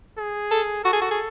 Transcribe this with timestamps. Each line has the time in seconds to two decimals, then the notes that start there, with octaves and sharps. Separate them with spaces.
0.18 G#4
0.51 A4
0.84 F#4 A4
0.93 G#4
1.01 F#4
1.11 G#4